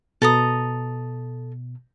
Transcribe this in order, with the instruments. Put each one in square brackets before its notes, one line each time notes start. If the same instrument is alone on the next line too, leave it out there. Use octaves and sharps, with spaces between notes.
[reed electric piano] B2 [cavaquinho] A4 A#5 D#6